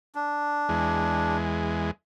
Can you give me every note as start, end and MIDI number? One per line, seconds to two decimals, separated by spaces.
0.15 1.37 62
0.69 1.91 40
0.69 1.91 56